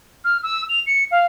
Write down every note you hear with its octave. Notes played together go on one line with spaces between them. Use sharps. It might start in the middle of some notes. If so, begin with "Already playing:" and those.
F6
E6
F7
C#7
F5